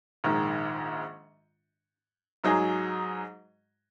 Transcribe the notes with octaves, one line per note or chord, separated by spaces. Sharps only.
A#1 G#2 D#3
G#2 F#3 D#4 G#4